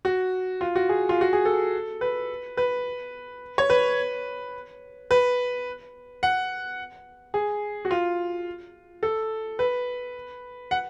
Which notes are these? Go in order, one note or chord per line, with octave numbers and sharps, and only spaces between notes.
F#4
F4
F#4
G#4
F4
F#4
G#4
A4
B4
B4
C#5
B4
B4
F#5
G#4
F#4
F4
A4
B4
F#5